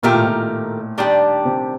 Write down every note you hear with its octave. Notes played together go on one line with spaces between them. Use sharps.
A#2 D#3 A3 D#4 G4 A#4
A2
A#2
D#3 G3 D4 G4
C3